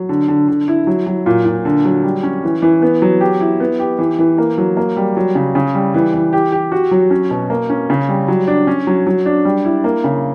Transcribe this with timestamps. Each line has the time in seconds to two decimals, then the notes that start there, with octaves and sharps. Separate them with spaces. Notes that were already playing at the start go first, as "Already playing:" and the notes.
Already playing: F#3
0.09 D3
0.28 D3
0.48 D3
0.68 E4
0.87 F#3
1.07 F#3
1.26 A#2
1.45 A#2
1.65 D3
1.85 F#3
2.04 G3
2.23 C#4
2.44 E3
2.62 E3
2.82 B3
3.02 F#3
3.21 G4
3.40 E4
3.60 B3
3.79 G4
3.99 E3
4.19 E3
4.38 A#3
4.58 F#3
4.77 A#3
4.97 G3
5.17 F#3
5.35 C#3
5.55 C#3
5.75 G3
5.94 E3
6.14 E3
6.33 G4
6.52 G4
6.72 F#4
6.91 F#3
7.11 C#4
7.31 B2
7.50 A#3
7.70 C#4
7.90 C#3
8.09 G3
8.28 F#3
8.47 D4
8.67 C#4
8.87 F#3
9.07 F#3
9.26 D4
9.45 G3
9.65 E4
9.84 A#3
10.04 C#3